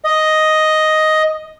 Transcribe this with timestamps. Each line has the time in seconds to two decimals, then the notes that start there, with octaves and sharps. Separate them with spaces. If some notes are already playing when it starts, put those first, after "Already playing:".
0.04 D#5